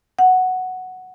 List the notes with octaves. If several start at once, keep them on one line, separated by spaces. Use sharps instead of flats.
F#5